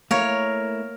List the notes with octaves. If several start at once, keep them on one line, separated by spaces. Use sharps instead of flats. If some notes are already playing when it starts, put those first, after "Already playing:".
A3 A#3 E4 A#4 C#5 F5